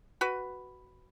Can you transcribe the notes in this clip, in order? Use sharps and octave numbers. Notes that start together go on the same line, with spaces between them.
F#4 B4